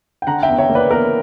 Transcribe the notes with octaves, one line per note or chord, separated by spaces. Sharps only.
G5
D3 F#5 A#5
E5 G5
E2
C#5 E5
A#3
B4 D5
E2 A#4 C#5